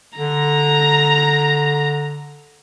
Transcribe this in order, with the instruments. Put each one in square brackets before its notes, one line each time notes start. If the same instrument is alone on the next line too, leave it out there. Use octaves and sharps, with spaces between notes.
[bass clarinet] D3 [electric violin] A#5